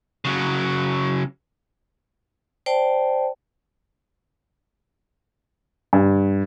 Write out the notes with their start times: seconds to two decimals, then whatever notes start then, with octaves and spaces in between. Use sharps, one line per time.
0.25 C#3 F#3
2.66 C5 D5 G5 A5
5.93 G2